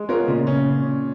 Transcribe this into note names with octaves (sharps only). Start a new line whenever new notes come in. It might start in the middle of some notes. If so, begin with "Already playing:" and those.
Already playing: G#3
B3 F4 A#4 C#5
A#2 C#3
C#4